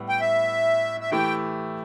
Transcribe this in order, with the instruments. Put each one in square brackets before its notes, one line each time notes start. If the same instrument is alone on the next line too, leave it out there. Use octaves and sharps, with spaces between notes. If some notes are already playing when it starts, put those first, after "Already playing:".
Already playing: [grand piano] A2 G3 B3
[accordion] G5
E5
E5
[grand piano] E3 A3 E4 G4 [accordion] G5